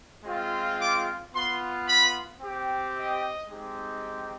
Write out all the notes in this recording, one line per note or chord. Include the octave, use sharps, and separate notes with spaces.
G#3 C4 F4
D6
B3 F4 C6
B5
C4 G4
D#5
G#3 C4 D#4 G4